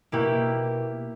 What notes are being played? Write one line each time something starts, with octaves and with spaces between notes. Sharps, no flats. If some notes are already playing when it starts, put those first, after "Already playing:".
B2 A#3 E4 G4